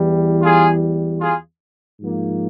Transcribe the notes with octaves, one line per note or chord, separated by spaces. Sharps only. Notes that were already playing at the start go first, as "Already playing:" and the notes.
Already playing: E2 E3 G3
F4 G#4
F4 G#4
G#2 F3 A#3